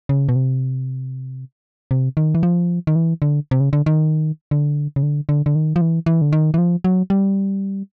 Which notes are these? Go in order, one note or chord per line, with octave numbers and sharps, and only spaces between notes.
C#3
B2
C3
C3
D#3
E3
F3
D#3
E3
D3
C3
C#3
D3
D#3
D3
C#3
D3
D3
D3
D#3
F3
E3
E3
D3
D#3
E3
F3
F#3
G3